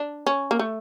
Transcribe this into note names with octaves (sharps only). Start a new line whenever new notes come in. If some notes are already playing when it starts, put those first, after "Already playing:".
Already playing: D4
C#4
A#3
A3